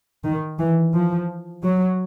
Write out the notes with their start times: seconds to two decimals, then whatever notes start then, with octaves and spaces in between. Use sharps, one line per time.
0.24 D#3
0.58 E3
0.94 F3
1.63 F#3